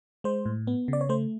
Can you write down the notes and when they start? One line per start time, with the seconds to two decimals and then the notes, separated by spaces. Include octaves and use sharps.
0.24 G#3 C5
0.46 A2
0.67 B3
0.88 C#3 D5
1.01 C#5
1.09 A3 C5